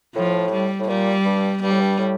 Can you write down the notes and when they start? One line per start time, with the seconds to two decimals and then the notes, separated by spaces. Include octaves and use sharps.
0.15 A2 F3
0.52 G3
0.79 A2
0.88 A#2 G3
1.25 G2
1.63 G2 G3
1.71 A2
1.80 G2
1.99 A2